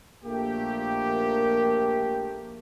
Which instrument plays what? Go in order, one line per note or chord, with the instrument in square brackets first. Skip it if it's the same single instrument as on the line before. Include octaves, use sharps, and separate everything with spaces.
[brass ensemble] A#1 A3 A#3 G4